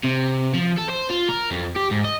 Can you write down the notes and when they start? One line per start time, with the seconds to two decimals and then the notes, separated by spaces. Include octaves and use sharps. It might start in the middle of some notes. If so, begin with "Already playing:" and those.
0.03 C3
0.54 F3
0.77 A4
0.89 C5
1.10 F4
1.28 A#4
1.51 F2
1.76 G4
1.91 G#2
2.05 D#5